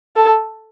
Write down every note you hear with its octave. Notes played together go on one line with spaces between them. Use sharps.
A4